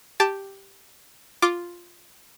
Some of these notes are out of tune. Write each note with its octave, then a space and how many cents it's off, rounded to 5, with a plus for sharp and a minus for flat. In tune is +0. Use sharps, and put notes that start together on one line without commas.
G4 +0 A5 +0
F4 +0 D6 +0